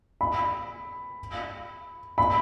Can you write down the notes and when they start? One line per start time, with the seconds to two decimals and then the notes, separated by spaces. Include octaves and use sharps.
0.21 B5
2.18 B5